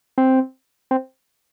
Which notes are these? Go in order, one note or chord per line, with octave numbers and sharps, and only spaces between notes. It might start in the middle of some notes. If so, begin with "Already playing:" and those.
C4
C4